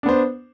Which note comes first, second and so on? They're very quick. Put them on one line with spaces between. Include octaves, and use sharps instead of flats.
D4 B3 C5